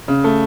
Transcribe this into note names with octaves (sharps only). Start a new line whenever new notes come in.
C#3
A3